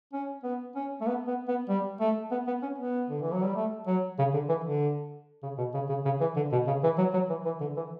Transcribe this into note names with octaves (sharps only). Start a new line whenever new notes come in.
C#4
B3
C#4
A3
B3
B3
B3
G3
A3
B3
B3
C#4
B3
D3
E3
F#3
G3
A3
F#3
C#3
D3
E3
D3
C#3
B2
C#3
C#3
C#3
E3
D3
B2
C#3
E3
F#3
F#3
E3
E3
D3
E3